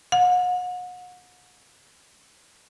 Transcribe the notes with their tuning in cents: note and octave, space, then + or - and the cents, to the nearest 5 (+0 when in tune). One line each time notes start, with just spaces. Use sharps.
F#5 -40